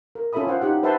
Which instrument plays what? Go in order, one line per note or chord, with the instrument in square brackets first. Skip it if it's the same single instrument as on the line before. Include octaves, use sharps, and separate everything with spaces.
[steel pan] A#4
C#4 F4 A4 E5 B5 D#6
E4 F4 C5 F5 F#5
D#4 G4 F#5
B4 C5 E5 F#5 A5 C6